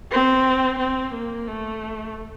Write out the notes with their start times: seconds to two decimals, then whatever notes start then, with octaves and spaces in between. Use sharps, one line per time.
0.11 C4
0.79 C4
1.13 A#3
1.47 A3